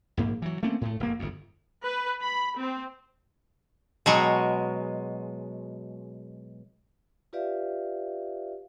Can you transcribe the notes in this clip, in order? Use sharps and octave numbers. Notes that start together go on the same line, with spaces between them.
A#1 G#2 A#3
E3 F#3
A3 A#3 C4 C#4
A2 A3
F1 A#3
G1 F2
B4
B5
C4
B2 F#3 G#3
F4 G4 B4 D5 E5 F5